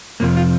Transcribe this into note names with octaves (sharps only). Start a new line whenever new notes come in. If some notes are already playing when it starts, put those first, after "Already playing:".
F2 C3 F3 A#3
F4